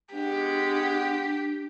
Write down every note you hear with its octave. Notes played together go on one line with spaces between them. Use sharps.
G#3 B3 D4 G4 F#5